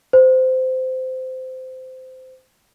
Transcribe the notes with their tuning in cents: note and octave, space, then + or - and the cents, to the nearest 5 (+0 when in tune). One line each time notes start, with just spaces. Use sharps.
C5 -20